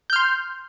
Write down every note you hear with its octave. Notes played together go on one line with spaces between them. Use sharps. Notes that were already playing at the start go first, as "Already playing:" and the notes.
C6 F6 G6